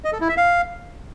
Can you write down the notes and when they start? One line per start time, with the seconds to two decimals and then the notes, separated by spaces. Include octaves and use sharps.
0.04 D#5
0.13 A4
0.21 E4
0.29 E5
0.37 F5